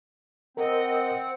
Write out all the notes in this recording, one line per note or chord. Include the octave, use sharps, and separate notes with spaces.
C4 A#4 D#5 F#5